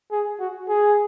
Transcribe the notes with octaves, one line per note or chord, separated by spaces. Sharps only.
G#4
F#4
G#4